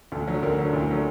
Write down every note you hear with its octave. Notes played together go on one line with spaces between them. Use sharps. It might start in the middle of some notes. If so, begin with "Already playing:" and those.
D2 A4
D3 F#3
D2 A#4
D3 F#3
D2 E4
D3 F#3